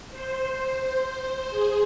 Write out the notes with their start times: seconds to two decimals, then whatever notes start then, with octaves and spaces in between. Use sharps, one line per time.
0.11 C5
1.50 G#4